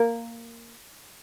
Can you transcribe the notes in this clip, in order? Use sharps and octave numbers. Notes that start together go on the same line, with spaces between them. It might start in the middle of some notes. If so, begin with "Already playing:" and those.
Already playing: A#3